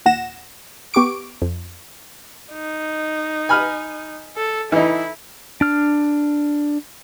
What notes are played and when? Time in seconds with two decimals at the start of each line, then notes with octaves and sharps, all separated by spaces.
0.05 D#2 A#2 F#5 A#6 E7
0.94 B3 G4 C#6 D6 D7
1.42 F2
2.53 D#4
3.49 G#5 B5 F6
4.37 A4
4.72 E3 D#4 E4
5.61 D4 F6